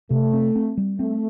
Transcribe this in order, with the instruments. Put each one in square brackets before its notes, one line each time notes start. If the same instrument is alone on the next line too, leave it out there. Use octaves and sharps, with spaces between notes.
[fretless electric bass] C3 [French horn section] A3
[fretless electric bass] C4
C4
G3
[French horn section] A3 [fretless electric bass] C4